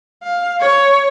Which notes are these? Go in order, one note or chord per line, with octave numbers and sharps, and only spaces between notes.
F5
C#5